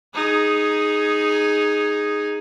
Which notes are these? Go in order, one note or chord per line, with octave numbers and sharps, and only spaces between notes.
D#4 G#4